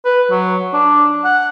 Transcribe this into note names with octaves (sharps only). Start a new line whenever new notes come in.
B4
F#3
D4
F#5